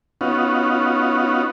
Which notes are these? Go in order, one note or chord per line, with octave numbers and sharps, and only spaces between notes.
B3 C#4 D#4 F4 F#4